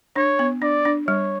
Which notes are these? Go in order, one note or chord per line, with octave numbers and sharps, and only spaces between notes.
D4 C#5
B3
D4 D5
D4
G3 C#5